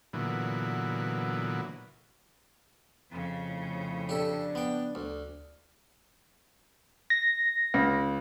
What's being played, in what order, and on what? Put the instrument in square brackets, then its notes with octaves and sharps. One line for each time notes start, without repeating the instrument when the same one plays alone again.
[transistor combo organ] A#2 D3 E3 F#3 B3
[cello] F2 C#3
[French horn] A2
[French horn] D4 [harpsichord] G4 A4
[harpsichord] B3 G5
D2
[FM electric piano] A#6
[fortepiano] C#2